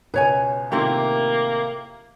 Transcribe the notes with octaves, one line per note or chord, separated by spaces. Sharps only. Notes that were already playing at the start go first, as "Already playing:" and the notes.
C#2 B2 B4 C#5 G#5
A2 C3 D#3 A#3 E4 F4 G4